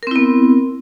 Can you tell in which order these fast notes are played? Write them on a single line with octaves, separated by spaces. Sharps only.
A#4 C4 E4 B3